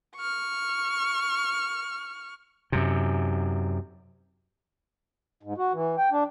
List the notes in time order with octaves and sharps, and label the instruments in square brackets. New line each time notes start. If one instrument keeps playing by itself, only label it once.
[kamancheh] C#6 F6
[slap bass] F#2 C3
[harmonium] G#2
F#4
E3
G5
D4